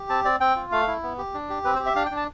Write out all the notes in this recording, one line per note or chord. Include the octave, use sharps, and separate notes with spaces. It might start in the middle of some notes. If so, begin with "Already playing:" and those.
Already playing: G4
C4 A5
C4 D5
C4 G5
F4
A3 F5
E4
B3
G4
D4
G4
C4 B4
C5
G4
E5
D4 F5
G5
D4
A5